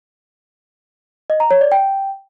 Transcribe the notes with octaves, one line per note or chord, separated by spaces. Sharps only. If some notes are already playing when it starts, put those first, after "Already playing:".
D#5
A#5
C#5
D5
G5